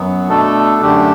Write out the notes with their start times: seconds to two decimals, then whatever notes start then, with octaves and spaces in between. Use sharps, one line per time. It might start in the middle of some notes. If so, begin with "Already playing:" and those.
Already playing: F#2 F#3 B3
0.28 B2 A3 D4 A4
0.81 F#2 D3 A3 D4 G4